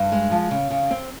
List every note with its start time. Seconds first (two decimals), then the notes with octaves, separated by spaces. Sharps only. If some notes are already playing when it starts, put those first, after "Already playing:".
Already playing: G2
0.12 G#3
0.31 F3
0.51 C#3
0.71 C#3
0.91 C4